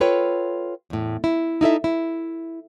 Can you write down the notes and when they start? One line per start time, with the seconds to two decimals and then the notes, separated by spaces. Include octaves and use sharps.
0.01 F4 A4 B4 C#5 G5
0.90 E2 A2
1.24 E4
1.61 D#4 E4 A4 E5
1.84 E4